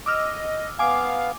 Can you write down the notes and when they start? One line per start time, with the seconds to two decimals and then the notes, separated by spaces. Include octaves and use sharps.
0.06 D#5 D6 E6 F6
0.79 B3 F5 G#5 D6